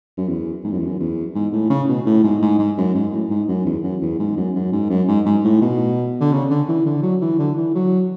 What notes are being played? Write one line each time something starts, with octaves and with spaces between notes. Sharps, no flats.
F#2
E2
G#2
F#2
E2
F#2
E2
G#2
A2
C#3
B2
A2
G#2
G#2
G#2
F#2
G#2
A2
G#2
F#2
E2
F#2
E2
G#2
F#2
F#2
G#2
F#2
G#2
G#2
A2
B2
D3
C#3
D3
E3
D3
F#3
E3
D3
E3
F#3